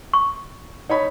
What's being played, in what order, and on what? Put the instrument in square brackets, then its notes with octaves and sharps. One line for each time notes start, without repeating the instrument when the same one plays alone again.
[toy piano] C#6
[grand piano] D#4 C#5 B5